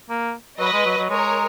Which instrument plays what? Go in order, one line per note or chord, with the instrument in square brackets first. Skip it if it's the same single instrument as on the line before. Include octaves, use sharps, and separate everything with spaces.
[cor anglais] A#3
[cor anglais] F#3 [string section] B4 D#5
[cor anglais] G#3
F#3
F#3
[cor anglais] G#3 [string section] A#4 C#5